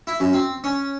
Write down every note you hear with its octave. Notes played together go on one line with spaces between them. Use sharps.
E4
F#2
C4
C#4